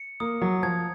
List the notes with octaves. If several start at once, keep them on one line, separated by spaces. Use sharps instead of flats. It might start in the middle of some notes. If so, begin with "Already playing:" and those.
Already playing: C#7
A#3 D#6
F#3
F3 G#6